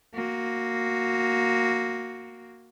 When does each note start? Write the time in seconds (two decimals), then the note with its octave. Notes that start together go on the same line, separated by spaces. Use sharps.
0.15 A#3 F#4